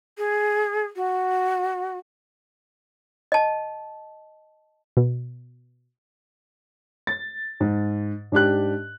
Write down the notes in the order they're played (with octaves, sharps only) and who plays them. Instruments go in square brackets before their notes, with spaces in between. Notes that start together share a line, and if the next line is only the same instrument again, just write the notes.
[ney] G#4
F#4
[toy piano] D#5 A5
[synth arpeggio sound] B2
[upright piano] A6
G#2
G#2 D4 G4 F#6